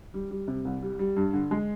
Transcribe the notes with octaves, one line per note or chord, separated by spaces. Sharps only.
G3
G3
C3
C2
G3
G3
G2
D3
G#3